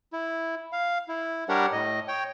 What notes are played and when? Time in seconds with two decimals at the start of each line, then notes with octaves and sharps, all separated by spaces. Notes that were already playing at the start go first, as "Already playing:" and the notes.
0.13 E4
0.72 F5
1.08 E4
1.49 G3 D4 G4 A#4 C#5 F#5
1.72 A2 D#5
2.08 C#5 G5